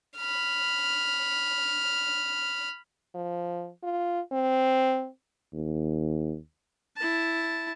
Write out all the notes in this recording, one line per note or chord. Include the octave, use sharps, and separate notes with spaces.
B5 F6
F3
F4
C4
D#2
E4 A5